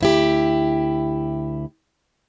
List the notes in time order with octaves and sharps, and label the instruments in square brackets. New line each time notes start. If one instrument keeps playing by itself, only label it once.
[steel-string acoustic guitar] D2 E4 G4